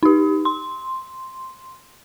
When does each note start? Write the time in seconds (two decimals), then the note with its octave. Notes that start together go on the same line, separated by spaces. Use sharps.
0.03 D#4 G4
0.45 C6